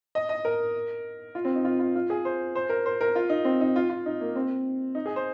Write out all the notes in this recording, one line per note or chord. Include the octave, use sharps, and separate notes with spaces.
D#5
D#5
A#4
F4
C4
D#4
F4
F4
F4
G#4
C5
C5
A#4
C5
A#4
F4
D#4
C4
D#4
F4
F4
D#4
A#3
C4
D#4
G#4
C5